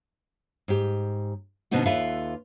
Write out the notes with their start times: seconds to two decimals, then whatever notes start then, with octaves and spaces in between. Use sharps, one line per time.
0.68 G#2 G4
1.71 B2 D3 B3 C4 D#4 F#4
1.86 D#2 F4 A4 B4 E5 F5